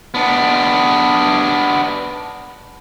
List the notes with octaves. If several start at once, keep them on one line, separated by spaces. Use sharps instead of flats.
B3 D4